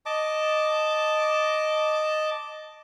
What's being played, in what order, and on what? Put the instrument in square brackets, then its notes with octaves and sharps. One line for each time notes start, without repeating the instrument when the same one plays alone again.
[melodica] D#5 A5 D6